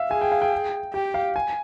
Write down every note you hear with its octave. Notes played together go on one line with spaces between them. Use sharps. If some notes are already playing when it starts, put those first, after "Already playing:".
Already playing: E5 F5
G#4 G#5
G5
F5
G5
G4 G5
F5
G#5